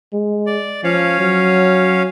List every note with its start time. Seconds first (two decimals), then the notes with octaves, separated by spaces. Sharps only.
0.13 G#3
0.46 D5
0.84 F3 C#4 C#5 F5
1.20 F#3